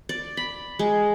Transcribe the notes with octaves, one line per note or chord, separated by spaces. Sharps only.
D5
B5
G#3